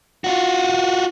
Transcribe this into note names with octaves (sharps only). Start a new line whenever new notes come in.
F4 F#4